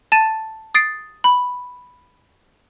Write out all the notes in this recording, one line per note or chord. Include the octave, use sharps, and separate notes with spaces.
A5 A6 D#7 E7
D#6 A6 C7 D7
B5